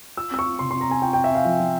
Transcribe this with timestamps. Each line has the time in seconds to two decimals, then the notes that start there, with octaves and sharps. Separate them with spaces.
0.17 F4 E6
0.31 C4 E6
0.39 C#6
0.46 F4
0.59 C3 C6
0.71 C4 C6
0.81 A#5
0.88 C4 G#5
1.02 F4 G5
1.13 C4 G5
1.24 E5
1.30 C4 F5
1.45 F3
1.60 F3